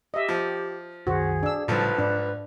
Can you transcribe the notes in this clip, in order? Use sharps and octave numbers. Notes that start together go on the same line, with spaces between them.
G4 D#5 E5
F3
C2 F#2 D#3 F#4 G#4 C5
D4 E6
B1 A2 C#3 F3 G3 A4 B4
G#2 D4